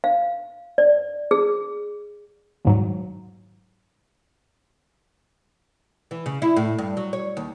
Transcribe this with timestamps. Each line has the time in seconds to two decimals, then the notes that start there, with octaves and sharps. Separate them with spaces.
0.04 F5
0.78 D5
1.31 G#4
2.65 D#2 G#2 F#3
6.11 E3
6.26 C#3
6.42 E4
6.57 A2
6.78 G2
6.97 F#3
7.13 C#5
7.37 D#2